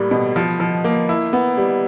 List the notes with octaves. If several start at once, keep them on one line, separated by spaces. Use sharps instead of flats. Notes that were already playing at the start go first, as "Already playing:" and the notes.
Already playing: A2 G3 A#3
B2
F3
F3
A#3
E4
B3
G3